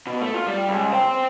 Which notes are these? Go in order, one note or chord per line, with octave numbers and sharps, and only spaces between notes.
B2
A3
F4
G3
C#2
C5 G5